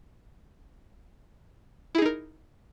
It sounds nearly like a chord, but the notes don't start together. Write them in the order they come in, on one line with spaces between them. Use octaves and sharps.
E4 G#4 D#4 A#4